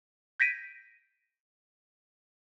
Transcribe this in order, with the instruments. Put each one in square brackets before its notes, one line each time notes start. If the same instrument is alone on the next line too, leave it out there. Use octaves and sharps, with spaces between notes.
[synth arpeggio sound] G6 G#6 A#6 B6 D7 D#7